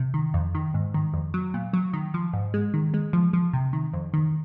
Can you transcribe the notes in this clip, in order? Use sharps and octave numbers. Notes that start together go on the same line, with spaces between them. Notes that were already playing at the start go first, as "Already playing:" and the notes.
Already playing: C3
D#3
F2
D#3
G#2
D#3
F2
F#3
A#2
F#3
D#3
F3
G#2
G#3
D#3
G#3
F3
F3
C3
D#3
F2
D#3